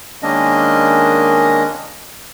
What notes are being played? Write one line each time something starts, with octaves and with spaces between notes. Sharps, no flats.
D#3 G#3 A#3 C#4 D4 D#5